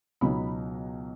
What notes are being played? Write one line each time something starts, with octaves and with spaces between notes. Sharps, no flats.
C#2 B2 F#3 B3 D#4 B5